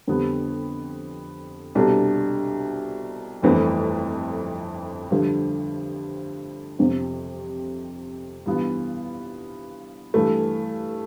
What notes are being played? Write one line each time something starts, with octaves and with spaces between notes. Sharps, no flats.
F2 D3 G3 B3
C2 B2 G3 D4 A4
G1 F2 E3 A3
G2 D3 F3
F2 C3 F3
G2 E3 B3 F4
G2 E3 A3